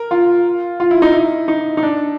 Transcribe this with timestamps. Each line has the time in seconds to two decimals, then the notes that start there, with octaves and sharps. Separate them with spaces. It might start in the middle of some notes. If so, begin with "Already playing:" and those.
Already playing: A#4
0.11 F4
0.80 F4
0.91 E4
1.02 D#4
1.13 E4
1.48 D#4
1.77 D#4
1.83 D4